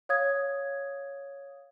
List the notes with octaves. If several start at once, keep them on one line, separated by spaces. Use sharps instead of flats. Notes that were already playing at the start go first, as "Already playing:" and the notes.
C#5 F5 D#6 G#6